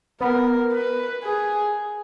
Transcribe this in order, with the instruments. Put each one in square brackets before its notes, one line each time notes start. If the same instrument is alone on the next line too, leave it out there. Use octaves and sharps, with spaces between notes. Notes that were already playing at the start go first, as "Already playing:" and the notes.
[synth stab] B3 [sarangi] A#4
[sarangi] B4
G#4